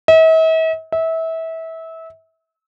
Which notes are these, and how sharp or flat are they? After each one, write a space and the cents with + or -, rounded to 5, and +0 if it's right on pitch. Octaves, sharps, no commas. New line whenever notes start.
E5 -45
E5 -25